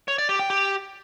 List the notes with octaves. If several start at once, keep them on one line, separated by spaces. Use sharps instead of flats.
C#5
D5
G4
G5
G4